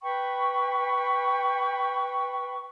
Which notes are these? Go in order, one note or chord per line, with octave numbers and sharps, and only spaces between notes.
B4 G5 B5 C#6